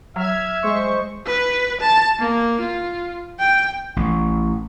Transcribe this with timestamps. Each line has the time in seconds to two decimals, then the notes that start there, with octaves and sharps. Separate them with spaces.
0.16 F#3 E5 F6 G#6
0.63 G#3 C5 C#6
1.26 B4
1.81 A5
2.19 A#3
2.61 F4
3.40 G5
3.96 A1